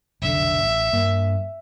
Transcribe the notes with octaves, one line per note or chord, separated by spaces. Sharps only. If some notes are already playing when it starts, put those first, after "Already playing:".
F1 B1 D3 E5
A1
G2 A#3